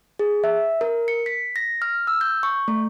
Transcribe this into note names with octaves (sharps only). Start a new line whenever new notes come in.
G#4
E5
A#4
C#7
B6
A#6
F6
E6
G6
C#6
A3